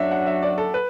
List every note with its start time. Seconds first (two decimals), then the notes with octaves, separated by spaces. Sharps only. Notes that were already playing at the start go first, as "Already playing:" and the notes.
Already playing: F#2 F#3 D4 F#4 E5
0.11 F#5
0.27 E5
0.43 D5
0.58 A4
0.74 B4